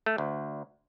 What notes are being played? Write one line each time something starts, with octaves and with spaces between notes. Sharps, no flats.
A3
D2